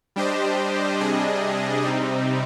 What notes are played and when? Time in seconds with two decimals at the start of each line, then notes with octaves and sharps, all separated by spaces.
0.16 G3 D4 G4 C5 D#5
1.00 C3 G3 D4 G#4 D#5
1.85 C3 G3 C4 D#4